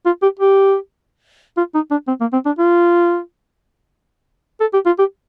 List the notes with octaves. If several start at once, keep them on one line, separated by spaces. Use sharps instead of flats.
F4
G4
G4
F4
D#4
D4
C4
A#3
C4
D4
F4
A4
G4
F4
G4